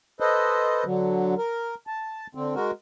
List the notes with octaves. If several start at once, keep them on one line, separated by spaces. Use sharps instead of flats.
A4 B4 C5 D#5
D3 F#3
A#4
A5
D3 C4
G#3 F#4 A#4